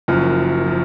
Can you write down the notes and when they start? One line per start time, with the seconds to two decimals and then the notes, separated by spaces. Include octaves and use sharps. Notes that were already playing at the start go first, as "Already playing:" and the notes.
0.08 F#1 F#2 F3
0.66 F3